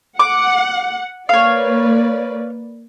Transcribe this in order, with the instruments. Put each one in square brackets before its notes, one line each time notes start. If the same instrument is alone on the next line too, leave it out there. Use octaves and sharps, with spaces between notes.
[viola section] F#5 [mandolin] D6
[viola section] A#3 B4 D5 [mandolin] C#5 F5